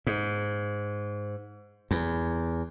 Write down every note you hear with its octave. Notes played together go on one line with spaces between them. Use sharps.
G#2
E2